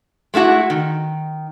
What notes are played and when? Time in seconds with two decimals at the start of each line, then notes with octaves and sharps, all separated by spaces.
0.34 G#3 A3 E4 F#4
0.70 D#3